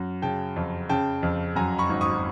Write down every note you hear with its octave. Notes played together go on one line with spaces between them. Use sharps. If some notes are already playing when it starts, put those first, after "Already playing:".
Already playing: F#2
C#3 G5 A5
F2
C#3 G5 A5
F2
F#2 G#5 A#5
B5 C#6
G#1
C#6 D#6